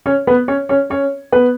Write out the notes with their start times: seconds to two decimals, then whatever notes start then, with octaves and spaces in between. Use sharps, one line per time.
0.06 C#4 C#5
0.27 B3 B4
0.48 C#4 C#5
0.69 C#4 C#5
0.90 C#4 C#5
1.32 B3 B4